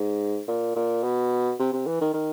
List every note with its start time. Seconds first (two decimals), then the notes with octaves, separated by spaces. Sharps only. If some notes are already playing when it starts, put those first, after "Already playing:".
Already playing: G#2
0.48 A#2
0.76 A#2
1.03 B2
1.59 C3
1.73 C3
1.87 E3
2.01 D#3
2.14 D#3